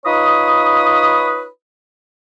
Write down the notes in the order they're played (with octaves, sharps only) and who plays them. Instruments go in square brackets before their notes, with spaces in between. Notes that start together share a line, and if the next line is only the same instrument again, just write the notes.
[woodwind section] D#4 F4 B4 C#5 B5 D#6